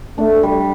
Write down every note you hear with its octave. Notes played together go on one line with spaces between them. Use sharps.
A3 D4
G3